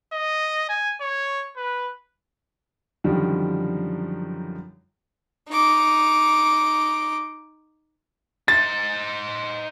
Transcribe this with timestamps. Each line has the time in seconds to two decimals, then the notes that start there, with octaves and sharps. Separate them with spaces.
0.13 D#5
0.69 G#5
1.01 C#5
1.57 B4
3.04 F#2 D3 D#3 F3 G3
5.50 D#4 D6
8.48 D#4 C5 A6